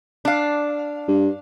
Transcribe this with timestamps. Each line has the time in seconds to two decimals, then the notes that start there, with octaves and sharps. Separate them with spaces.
0.25 D4 F5
1.08 G2